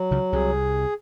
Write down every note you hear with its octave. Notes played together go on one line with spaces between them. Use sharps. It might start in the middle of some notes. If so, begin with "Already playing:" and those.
Already playing: F#3
C#2 C#3
C2 C3 G#4